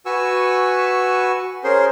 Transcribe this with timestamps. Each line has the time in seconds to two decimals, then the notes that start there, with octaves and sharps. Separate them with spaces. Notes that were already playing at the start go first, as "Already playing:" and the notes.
0.06 F#4 B4 G#5 C#6 E6
1.64 C#4 G#4 A#4 C5 C6